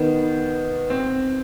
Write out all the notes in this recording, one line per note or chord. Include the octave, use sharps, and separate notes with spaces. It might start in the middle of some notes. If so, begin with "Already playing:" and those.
Already playing: D#3 B3
C4